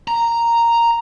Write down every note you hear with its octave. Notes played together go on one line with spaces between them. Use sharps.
A#5